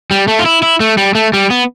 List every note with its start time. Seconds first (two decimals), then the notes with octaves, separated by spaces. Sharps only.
0.11 G3
0.28 A3
0.39 F4
0.46 E4
0.62 E4
0.80 A3
0.97 G3
1.15 A3
1.33 G3
1.50 B3